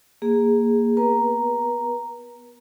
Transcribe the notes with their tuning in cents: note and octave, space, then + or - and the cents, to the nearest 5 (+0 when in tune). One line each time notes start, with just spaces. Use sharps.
A#3 +0 G#4 -15
B3 +0 B4 -45 A#5 +0